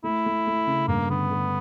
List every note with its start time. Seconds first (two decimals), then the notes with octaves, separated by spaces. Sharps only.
0.03 A3 E4
0.26 A3
0.47 A3
0.67 C#3
0.88 G2 A#3
1.09 D3 B3
1.31 D3